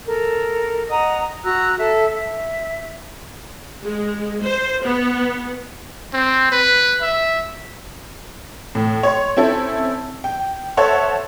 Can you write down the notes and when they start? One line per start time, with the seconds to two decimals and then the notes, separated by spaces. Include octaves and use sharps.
0.07 A4 A#4
0.90 D#5 F#5 A#5 D#6
1.44 F#4 A#5 E6 F#6
1.77 A4 E5 A5
2.14 E5
3.82 G#3
4.42 C5
4.84 B3
6.13 C4
6.52 B4
7.02 E5
8.75 A2
9.03 C#5 C6
9.37 C4 C#4 E4 A4
10.24 G5
10.77 A4 C5 C#5 E5 F#5 A5